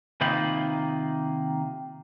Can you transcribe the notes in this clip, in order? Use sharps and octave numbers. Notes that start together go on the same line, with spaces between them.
C3 D#3 A#3 D#4 F4 B5